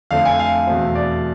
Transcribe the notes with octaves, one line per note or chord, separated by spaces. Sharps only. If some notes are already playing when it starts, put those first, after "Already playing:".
F2 D3 A3 C4 F5
G#5
F5
E2 B2 A3 C4
D5